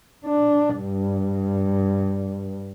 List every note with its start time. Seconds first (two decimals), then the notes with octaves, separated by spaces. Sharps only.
0.25 D4
0.79 G2